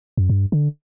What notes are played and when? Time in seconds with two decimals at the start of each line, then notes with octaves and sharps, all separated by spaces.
0.17 F#2
0.30 G2
0.52 D3